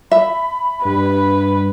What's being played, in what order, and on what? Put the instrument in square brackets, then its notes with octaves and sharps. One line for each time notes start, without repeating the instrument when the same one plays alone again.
[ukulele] E5 [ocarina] B5
[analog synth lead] G2 [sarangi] B4